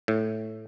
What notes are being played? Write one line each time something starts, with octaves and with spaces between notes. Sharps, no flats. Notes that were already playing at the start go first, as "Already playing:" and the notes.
A2